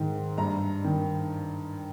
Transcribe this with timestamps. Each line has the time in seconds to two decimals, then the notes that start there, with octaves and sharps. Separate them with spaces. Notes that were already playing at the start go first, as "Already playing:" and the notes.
Already playing: G#2 D#3
0.38 G2 A#5
0.84 D#3